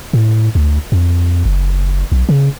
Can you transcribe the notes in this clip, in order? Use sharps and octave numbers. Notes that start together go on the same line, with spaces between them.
A2
D2
F2
F#1
B1
C#3